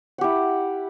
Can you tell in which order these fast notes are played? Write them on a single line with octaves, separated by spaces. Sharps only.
F#5 G4 E4